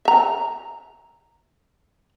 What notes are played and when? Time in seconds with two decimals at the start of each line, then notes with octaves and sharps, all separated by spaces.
0.05 E5 A#5